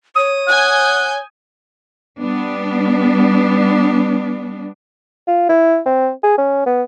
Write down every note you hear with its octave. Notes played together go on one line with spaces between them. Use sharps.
C#5 D#6
F#5 G#5 G6
G3 B3 D4
F4
E4
C4
G#4
C#4
B3